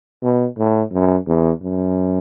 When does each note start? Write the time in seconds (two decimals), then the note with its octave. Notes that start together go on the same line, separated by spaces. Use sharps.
0.22 B2
0.58 A2
0.92 F#2
1.27 E2
1.62 F#2